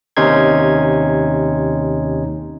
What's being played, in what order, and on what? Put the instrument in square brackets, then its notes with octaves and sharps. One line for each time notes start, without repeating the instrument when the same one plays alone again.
[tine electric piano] D#2 C3 C#4 D#4 C6 G#6